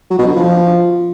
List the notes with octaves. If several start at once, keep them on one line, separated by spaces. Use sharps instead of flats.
F#3
B2
D3
F3